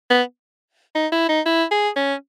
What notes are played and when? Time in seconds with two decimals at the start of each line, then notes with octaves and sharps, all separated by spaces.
0.10 B3
0.95 D#4
1.12 E4
1.29 D#4
1.46 E4
1.71 G#4
1.96 C#4